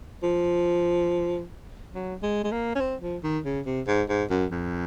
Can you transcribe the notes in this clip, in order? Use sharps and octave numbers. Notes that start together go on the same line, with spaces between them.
F3
F#3
G#3
G#3
A#3
C#4
C4
F3
D#3
C#3
C3
G#2
G#2
F#2
F2